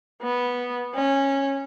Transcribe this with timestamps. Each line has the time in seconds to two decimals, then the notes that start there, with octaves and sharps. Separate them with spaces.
0.22 B3
0.94 C#4